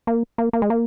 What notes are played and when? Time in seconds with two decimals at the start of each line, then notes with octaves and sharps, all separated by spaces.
0.07 A#3
0.38 A#3
0.53 A#3
0.62 G#3
0.70 A#3